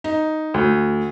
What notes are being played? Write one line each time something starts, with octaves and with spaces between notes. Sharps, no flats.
D#4
D2